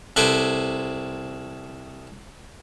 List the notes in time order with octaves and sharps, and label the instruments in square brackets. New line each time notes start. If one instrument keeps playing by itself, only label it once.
[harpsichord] C2 A4 B4 C5 G#5 D6